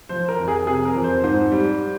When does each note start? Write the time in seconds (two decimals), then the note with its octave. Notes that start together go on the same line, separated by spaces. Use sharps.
0.09 F3 C5
0.29 A#4
0.38 F2
0.43 A#4
0.48 G#4
0.66 C3 G#4
0.85 A#4
0.95 F2
1.04 C5
1.23 G#2 C5
1.52 G3